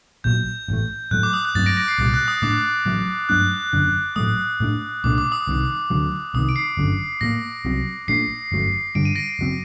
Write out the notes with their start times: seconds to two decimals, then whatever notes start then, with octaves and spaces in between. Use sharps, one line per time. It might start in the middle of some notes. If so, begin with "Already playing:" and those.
0.24 A#1 A#2 F#3 G6
0.68 A1 A2 A3
1.11 A2 F#3 A3 F#6
1.23 D6
1.33 D#6
1.45 F#6
1.55 G2 F#3 A3 C4 A6
1.66 A#6 D7
1.77 A#6 D7
1.88 C7
1.98 C2 A#2 G3 A6
2.14 F#6
2.28 D#6
2.42 A2 A3 D4 D6
2.86 A1 A2 F#3 A3
3.29 G2 F#3 A3 D4 F#6
3.73 F#1 F#2 D3
4.16 A1 A2 F#3 A3 D#6
4.60 A2 A3 D4
5.04 C2 A#2 A3 D4 D6
5.18 D6
5.32 D#6
5.47 C2 C3 D#3
5.90 D2 D3 F#3 A3
6.34 C2 C3 D#3 D#6
6.49 D7
6.56 C7
6.77 G1 F#2 D3
7.21 A2 F#3 A#3 A#6
7.65 C2 C3 F#3 C4
8.08 A#1 A#2 A3 D4 C7
8.52 G1 F#2 F#3 A3
8.95 G2 D3 G3 D7
9.05 D#7
9.16 A#6 D7
9.39 F#1 F#3 C4